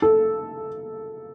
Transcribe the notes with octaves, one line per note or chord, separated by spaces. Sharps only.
A4